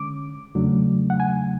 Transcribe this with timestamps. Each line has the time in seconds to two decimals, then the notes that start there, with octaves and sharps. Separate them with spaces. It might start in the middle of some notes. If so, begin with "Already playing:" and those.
Already playing: D3 G#3 C#4 D6
0.55 E2 C#3 F#3 A3 D4
1.10 F#5
1.20 G#5